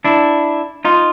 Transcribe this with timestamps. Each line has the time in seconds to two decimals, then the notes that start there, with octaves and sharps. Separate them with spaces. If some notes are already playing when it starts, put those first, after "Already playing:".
0.04 D4 E4
0.85 D#4 F4